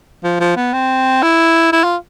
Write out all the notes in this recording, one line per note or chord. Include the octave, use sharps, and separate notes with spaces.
F3
F3
B3
C4
E4
E4
F4